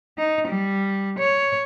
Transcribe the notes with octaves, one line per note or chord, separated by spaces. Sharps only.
D#4
G3
C#5